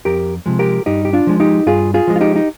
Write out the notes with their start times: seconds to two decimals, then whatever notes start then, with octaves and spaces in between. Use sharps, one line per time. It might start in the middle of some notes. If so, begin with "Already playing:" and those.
0.05 F2 G4 A#4
0.46 C3 F3 G#3
0.59 G4 A#4
0.86 G2 D#4 G4
1.05 G4
1.13 D4 F4
1.27 F3 G#3
1.40 D#4 G4
1.66 G2 F4 G#4
1.94 F4 G#4
2.07 F3 G#3
2.16 F4
2.21 D#4 G4
2.36 D#4